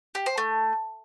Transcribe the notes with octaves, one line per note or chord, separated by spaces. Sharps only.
G4
C5
A3